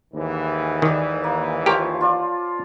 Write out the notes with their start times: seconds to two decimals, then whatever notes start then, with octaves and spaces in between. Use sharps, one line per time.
0.14 D#2 G#2 E3
0.82 D#3 D5
1.24 A#3
1.66 F3 G4 A#4 C5 C#5
2.01 F4 D5